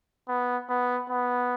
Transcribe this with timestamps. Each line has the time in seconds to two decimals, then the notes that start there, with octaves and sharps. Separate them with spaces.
0.29 B3
0.69 B3
1.10 B3